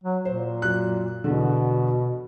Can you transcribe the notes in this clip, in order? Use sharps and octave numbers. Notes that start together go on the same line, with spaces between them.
F#3
A#2 C5
F#2 F#6
E2 B2 D3